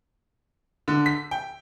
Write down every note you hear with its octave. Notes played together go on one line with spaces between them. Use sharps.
D3
B6
G5